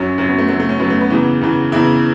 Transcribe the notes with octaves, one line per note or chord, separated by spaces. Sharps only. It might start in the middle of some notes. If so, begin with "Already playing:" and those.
Already playing: F#2 F#3 C#4
F#2 F#3 C#4
B3
A3
F#2 F#3 A3
A3
C#4
F#2 F#3 B3
A3
B3
E2 C#3 E3
E2 C#3 E3
E2 C#3 E3 E4